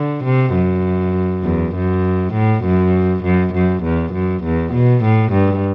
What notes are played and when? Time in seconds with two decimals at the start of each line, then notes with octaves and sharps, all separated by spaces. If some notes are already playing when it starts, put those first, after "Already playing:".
Already playing: D3
0.24 C3
0.55 F#2
1.44 E2
1.75 F#2
2.33 A2
2.64 F#2
3.24 F#2
3.54 F#2
3.84 E2
4.13 F#2
4.44 E2
4.73 B2
5.04 A2
5.32 G2